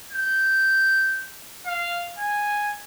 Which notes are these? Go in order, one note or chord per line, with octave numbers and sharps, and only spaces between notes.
G6
F5
G#5